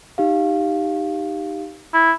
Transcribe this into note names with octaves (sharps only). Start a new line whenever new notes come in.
D#4 G4 F5
E4